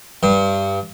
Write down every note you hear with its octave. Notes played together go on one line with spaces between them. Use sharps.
G2